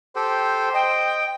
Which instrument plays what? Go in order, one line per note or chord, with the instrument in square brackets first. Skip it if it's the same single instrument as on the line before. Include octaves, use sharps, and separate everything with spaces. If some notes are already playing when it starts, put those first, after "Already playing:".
[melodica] G4 A4 G5 [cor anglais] C5
[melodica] D#5 [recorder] G5